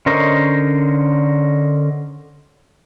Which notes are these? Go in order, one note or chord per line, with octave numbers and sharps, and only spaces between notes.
D3 C#4 A#4 C5 D#5